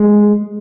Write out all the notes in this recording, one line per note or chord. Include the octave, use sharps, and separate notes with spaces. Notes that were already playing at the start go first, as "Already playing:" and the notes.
Already playing: G#3